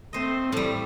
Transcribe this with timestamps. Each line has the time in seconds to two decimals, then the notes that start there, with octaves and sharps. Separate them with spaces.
0.13 A3 C4 C5 D#5
0.52 A2 G3 A4